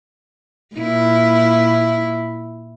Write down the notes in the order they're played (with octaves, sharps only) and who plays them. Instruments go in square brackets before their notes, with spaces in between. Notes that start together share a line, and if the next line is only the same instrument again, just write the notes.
[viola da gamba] A#2 E4